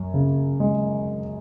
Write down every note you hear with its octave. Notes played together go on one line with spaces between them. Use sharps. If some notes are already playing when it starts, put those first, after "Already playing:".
Already playing: F#2
C#3
G#3